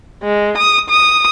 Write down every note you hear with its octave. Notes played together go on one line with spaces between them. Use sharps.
G#3
D#6
D#6